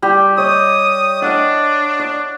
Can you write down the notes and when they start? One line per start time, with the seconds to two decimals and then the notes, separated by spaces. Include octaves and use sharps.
0.02 G3 G4
0.38 C#5 D#5 D#6
1.22 D4 D#5 F5 F#5
1.99 D5